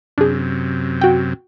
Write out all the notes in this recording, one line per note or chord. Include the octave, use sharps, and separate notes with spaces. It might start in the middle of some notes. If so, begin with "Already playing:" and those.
F#2 C3 D4 G#4
F#4 G5